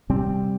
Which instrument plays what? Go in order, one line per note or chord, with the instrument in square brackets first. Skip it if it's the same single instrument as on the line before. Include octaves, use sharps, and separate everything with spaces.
[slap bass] C3 G3 C4